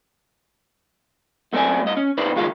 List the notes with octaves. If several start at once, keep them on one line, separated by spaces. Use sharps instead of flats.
F#2 A3 B3 C4 D5 G#5
G2 D#5
C#4
C3 D#4 B4 C5 D5
C#2 D#3 G#3 F4 F5